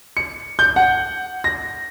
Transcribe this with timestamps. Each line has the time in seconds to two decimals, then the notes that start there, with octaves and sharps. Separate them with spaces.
0.17 C#7
0.59 G6
0.76 F#5
1.44 A#6